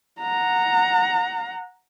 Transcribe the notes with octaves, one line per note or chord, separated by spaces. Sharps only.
F#5 A#5